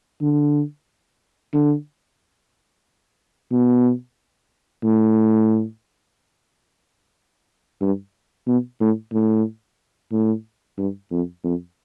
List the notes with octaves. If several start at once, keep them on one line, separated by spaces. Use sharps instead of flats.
D3
D3
B2
A2
G2
B2
A2
A2
A2
G2
F2
F2